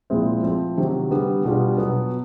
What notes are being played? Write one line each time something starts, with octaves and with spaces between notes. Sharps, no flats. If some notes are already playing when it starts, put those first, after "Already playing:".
A#2 F3 G#3 C4 E4
F3 A3 C4
C3 D#3 F#3
D3 G3 B3
B2 G3 B3 D4 F4
B2 F#3 B3